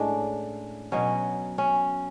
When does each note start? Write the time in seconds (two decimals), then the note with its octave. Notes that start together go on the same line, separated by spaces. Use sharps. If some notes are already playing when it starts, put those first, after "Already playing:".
Already playing: A2 G#3 C#4 D4
0.92 B2 F#3 C#4
1.58 C#4